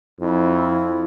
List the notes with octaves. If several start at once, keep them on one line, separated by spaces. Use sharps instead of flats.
F2 E4